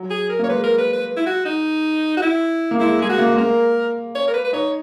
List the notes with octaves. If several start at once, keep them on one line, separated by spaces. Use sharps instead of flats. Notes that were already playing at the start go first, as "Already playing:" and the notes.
Already playing: F#3
G#4
A#4
A#3 C#5
G#3 B4
A#4
B4
B4
E4
F#4
D#4
F#4
E4
A#3
G#3 E4
G#3 G#4
F#4
A#3
G#3
A#3 A#4
C#5
A#4
B4
B4
D#4 C#5